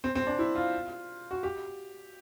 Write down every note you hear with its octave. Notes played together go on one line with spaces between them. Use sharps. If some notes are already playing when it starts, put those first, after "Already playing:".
C4
C4
D4
E4
F4
F#4
G4